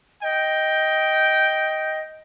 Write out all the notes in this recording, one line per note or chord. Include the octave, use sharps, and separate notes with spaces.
D#5 G5